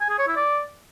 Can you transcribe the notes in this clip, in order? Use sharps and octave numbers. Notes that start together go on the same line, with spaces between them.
G#5
G#4
C#5
E4
D5